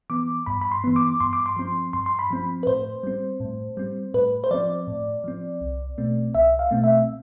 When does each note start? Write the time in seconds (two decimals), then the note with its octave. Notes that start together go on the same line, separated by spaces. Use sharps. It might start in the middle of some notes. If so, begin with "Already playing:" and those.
0.10 E3 B3 D6
0.46 G2 B5
0.61 B5
0.72 C6
0.84 E3 B3
0.96 D6
1.20 G2 C6
1.33 D6
1.46 C6
1.56 F3 C4
1.93 G2 C6
2.06 C6
2.19 B5
2.30 F3 C4
2.63 B4
2.67 A2 C5
3.03 G3 C4
3.40 A2
3.77 G3 C4
4.14 A2 B4
4.44 C5
4.51 F3 C4 D5
4.87 A2
5.24 F3 C4
5.61 C2
5.98 B2 A3 C4
6.35 C2 E5
6.59 F5
6.71 B2 A3 C4
6.84 E5